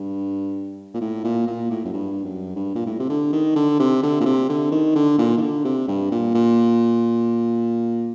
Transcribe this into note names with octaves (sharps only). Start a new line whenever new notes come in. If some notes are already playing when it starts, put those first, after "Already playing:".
Already playing: G2
A#2
A2
A#2
A#2
A2
F#2
G2
F#2
G2
A#2
A2
C3
D3
D#3
D3
C3
D3
A#2
C3
D3
D#3
D3
A#2
D#3
D3
C3
G2
A#2
A#2